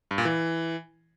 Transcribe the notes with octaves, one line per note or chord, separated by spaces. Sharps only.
G2
A#2
E3